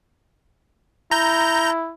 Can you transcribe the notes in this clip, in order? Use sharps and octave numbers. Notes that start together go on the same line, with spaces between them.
E4 A#5 G6